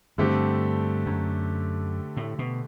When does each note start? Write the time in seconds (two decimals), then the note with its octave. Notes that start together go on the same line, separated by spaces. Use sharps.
0.18 G2 D3 A3 C4 G4
1.06 F#2
2.17 A2
2.39 B2